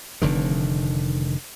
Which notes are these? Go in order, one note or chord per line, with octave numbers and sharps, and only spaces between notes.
F1 D3 D#3